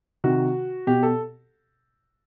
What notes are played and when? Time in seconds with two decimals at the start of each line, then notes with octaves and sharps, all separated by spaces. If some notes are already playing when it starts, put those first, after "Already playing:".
0.24 C3 D#3 F#4
0.87 B2 G4
1.03 A4